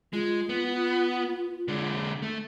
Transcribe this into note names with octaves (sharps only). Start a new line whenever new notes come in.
G#3 F4
B3
D3 G#3
A3